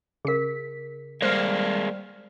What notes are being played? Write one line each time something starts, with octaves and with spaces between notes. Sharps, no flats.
C#3 G#4 A#4 B6
G3 G#3 A#3 C5 F6